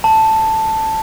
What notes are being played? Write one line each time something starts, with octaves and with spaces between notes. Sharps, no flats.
A5